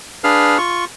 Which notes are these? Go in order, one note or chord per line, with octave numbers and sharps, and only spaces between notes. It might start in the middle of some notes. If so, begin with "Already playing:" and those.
D4 G#4 B4 F5 F6
F4 C#6